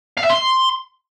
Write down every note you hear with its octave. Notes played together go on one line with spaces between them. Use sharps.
F5
E5
C6